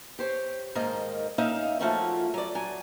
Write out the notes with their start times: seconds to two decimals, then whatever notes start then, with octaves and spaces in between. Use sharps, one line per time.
0.19 G4 C5 C#5
0.75 G#2 D#3 A#3 A#4 D#5
1.38 A#3 C#4 D#4 E5 F5
1.79 F3 A3 A#3 C#4 F4 F#4
2.34 F#3 D5
2.55 F#3 G#5